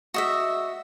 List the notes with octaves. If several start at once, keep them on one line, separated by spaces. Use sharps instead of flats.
F#4 D#5 E5